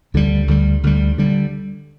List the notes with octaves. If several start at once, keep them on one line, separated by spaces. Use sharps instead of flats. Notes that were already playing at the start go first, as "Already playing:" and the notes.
D2 D3 G3
D2 D3 G3
D2 D3 G3
D3 G3